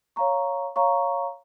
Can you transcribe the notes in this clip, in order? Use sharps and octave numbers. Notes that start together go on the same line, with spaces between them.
C#5 F5 A#5 C#6
C#5 F5 A#5 C#6